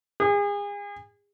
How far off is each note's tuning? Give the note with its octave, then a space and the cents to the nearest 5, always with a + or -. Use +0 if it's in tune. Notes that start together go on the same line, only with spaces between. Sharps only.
G#4 -35